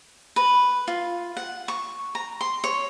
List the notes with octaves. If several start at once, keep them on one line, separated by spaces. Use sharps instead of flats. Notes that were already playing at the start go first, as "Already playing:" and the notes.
B4
F4
F#5
C#6
A#5
C6
C#5